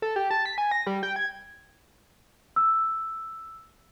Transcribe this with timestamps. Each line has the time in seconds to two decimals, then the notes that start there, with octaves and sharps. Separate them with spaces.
0.02 A4
0.16 G4
0.31 A5
0.46 B6
0.58 G#5
0.71 A#6
0.87 G3
1.03 G5
1.16 G#6
2.56 E6